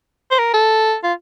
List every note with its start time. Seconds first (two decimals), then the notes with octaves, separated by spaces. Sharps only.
0.31 C5
0.39 A#4
0.54 A4
1.04 F4